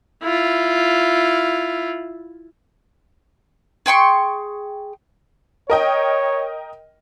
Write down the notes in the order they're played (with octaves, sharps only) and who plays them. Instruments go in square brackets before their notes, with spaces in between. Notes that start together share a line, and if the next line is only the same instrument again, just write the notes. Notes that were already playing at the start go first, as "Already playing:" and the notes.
[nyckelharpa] E4 F4
[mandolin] G#4 G5 C6 C#6
[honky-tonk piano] A#4 D#5 G5 [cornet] C#5